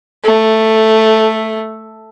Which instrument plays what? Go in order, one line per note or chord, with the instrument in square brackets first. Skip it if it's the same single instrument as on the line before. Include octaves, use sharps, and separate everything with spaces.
[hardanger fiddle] A3